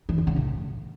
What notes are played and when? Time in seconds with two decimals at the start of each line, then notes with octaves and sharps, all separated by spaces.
0.09 E3
0.18 E2
0.27 C#3
0.36 A2